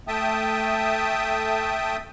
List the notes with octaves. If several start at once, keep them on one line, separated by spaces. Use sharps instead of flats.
A3 E5 G5 A5 D#6